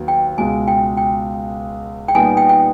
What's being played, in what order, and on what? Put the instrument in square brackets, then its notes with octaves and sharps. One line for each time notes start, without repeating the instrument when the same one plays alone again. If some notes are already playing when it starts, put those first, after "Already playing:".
Already playing: [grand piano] D#2 F#3 B3
[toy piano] G5
[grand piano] C#2 B2 G#3 [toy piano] G#5
[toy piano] G5
G5
G5
[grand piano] A#2 G3 B3 D#4 [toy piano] G#5
[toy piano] G5
G5